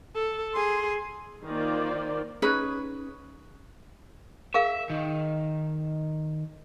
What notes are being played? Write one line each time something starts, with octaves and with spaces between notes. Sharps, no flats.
A4
G#4 C6
D#3 A#3 F4 C5 D5
C#4 D#4 G#4 B4
G#4 A#4 E5 F5
D#3